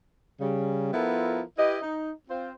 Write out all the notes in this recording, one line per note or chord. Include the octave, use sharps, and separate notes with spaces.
C#3 G3
F3 B3 E4 F4 A4 A#4
E4 G4 B4 D#5
D#4
C4 F4 C5